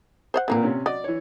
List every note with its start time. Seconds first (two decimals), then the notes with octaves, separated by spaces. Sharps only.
0.34 C5 C#5 F#5
0.48 A#2 D3 A#3 C4 A#4 B4
0.63 C3 C#4
0.86 F#3 D5 D#5
1.04 E3 C#5